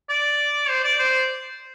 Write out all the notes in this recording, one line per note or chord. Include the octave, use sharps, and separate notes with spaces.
D5
C5
D5
C5